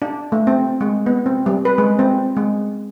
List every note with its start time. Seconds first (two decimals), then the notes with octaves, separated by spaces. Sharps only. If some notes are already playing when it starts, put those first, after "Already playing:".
0.02 D4
0.32 A3
0.47 C4
0.81 G#3
1.06 B3
1.26 C4
1.46 G3
1.65 B4
1.78 G#3
1.99 C4
2.37 G#3